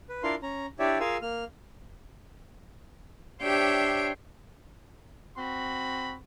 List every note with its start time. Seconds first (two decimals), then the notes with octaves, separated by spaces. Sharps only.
0.09 B4
0.23 D4 E4 F4 A#4 F5 C6
0.42 C#4 A#5
0.79 D4 E4 G4 C#5 D5 E5
1.00 F4 G#4 A#4 F5 G#5 E6
1.22 A#3 F6
3.43 D4 G4 C5 C#5 E5 G5
5.38 C4 F#4 B5